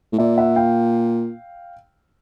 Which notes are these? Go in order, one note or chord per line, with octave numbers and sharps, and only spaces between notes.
A2
A#2 D5 E5
E5 F#5
F5 G5